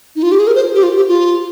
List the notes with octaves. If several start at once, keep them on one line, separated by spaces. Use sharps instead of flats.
D#4
F4
G4
G#4
A#4
C5
G4
F4
G4
F4